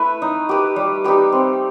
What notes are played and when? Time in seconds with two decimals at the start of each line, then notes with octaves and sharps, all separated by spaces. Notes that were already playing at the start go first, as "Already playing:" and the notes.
Already playing: A3 E4 B4
0.22 D#4
0.49 G4 B4
0.76 G3
1.04 D#4 G4 B4
1.32 C4